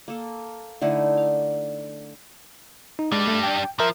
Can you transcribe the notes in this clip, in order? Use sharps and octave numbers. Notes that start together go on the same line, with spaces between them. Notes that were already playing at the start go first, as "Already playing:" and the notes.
A#3 A4
D3 A3 D#4 E4
F5
D#4
G3 G#3 D4
A3
G5
F3 A#4 E5 A#5